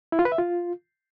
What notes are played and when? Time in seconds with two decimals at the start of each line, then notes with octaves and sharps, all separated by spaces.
0.12 E4
0.19 F4
0.25 B4
0.32 E5
0.38 F4